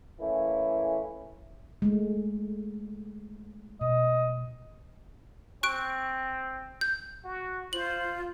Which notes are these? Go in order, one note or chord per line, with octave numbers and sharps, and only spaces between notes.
E3 A3 A#3 C#4 E4
G#3 A3
B2 D#5
C4 C#6 F#6 D7
G6
F#4
F4 C5 F#7